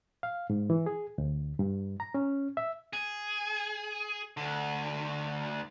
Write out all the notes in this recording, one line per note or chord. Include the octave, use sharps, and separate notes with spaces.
F5
G#2
E3
G#4
D2
G2
A#5
C#4
E5
G#4
D2 D3